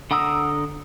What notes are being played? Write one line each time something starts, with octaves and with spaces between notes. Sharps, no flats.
D3 F#5 A#5 D#6 E6